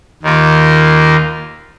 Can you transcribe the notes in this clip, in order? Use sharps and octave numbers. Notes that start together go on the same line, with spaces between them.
D#2 D#3 A#3 F4